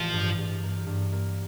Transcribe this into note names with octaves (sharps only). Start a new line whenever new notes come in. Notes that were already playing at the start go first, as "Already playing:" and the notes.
Already playing: A1 E3 F3
G2
G2
A#3
G2
A#3